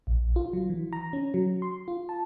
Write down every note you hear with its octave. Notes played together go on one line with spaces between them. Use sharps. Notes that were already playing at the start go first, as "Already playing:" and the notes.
A#1
F4
F#3
E3
A#5
C#4
F#3
C6
F4
A5